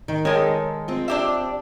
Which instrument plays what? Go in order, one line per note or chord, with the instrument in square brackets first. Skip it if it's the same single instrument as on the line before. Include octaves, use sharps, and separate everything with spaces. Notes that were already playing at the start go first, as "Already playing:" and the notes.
[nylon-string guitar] D#3
[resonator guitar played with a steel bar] D#3 G#3 A4 [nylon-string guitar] A#4 C#5
[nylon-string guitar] C4 F4
[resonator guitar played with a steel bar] D4 G4 E5